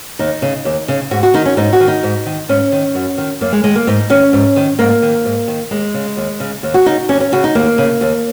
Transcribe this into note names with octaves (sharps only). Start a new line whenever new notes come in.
D#2 D#4
C#3
D#2
C#3
G#2 F#4
F#4
D#3 D#4
C#4
G#2 D#4
F#4
D#3
D#4
G#2
D#3
G#2 C#4
D#3
F#2
D#3
F#2 A#3
G#3
D#3 G#3
A#3
G#2 D#4
D#3 C#4
G#2
D#3
G#2 A#3
D#3
G#2
D#3
D#2 G#3
C#3
D#2
C#3
D#2
F#4
C#3 D#4
D#2 C#4
C#4
C#3 F#4
D#4
D#2 A#3
C#3
D#2